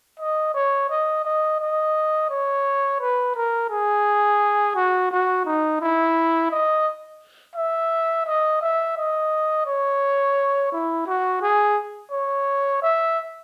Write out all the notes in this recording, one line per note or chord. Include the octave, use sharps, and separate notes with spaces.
D#5
C#5
D#5
D#5
D#5
C#5
B4
A#4
G#4
F#4
F#4
D#4
E4
D#5
E5
D#5
E5
D#5
C#5
E4
F#4
G#4
C#5
E5